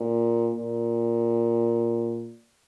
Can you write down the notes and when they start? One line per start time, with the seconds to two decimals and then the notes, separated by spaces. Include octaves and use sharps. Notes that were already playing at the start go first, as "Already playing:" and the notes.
Already playing: A#2
0.55 A#2